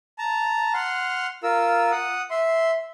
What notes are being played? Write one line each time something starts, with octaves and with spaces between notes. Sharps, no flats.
A5 A#5
F#5 C6 F6
F4 A#4 E6
F#5 D#6
E5 C6